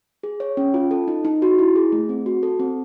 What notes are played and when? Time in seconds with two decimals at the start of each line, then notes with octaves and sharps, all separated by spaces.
0.23 G#4
0.40 C#5
0.57 C#4
0.74 F4
0.91 A4
1.08 D#4
1.25 D#4
1.42 F#4
1.58 E4
1.76 G#4
1.92 A3
2.09 C4
2.26 F#4
2.43 A4
2.60 C4